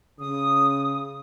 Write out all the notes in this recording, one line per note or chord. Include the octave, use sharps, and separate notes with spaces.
C#3 D#6